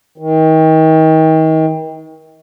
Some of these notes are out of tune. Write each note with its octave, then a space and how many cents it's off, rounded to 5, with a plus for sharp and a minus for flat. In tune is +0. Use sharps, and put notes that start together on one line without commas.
D#3 +35